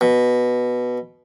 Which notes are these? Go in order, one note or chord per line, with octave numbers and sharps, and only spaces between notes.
B2